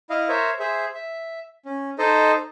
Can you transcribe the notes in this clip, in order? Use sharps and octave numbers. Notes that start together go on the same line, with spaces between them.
E4 D#5 F5
A#4 C5 C#5 E5
G#4 C5 E5
E5
C#4
D#4 A4 C5 D#5